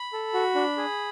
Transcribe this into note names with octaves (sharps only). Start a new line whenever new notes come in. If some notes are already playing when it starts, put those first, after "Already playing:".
Already playing: B5
A4
F#4
D4
G#4